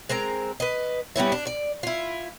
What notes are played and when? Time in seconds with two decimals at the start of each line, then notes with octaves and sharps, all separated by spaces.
0.09 G#3 C4 A#4 A#5
0.60 B4 D#5
1.16 G3 B3 C#4 E4
1.32 D4
1.47 D5
1.83 E4 F4